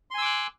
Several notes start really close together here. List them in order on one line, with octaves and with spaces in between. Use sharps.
C6 G#5 E6 D6 F#6